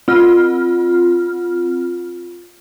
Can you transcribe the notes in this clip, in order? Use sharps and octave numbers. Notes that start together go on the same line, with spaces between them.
C4 F4 F6